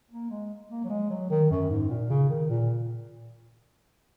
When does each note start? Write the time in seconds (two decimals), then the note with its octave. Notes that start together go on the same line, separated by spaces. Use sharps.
0.11 A#3
0.30 G#3
0.71 A#3
0.84 F#3
0.90 G#3
1.11 F#3
1.30 D#3
1.51 F#2
1.70 G#2
1.90 A#2
2.10 C#3
2.30 D#3
2.50 A#2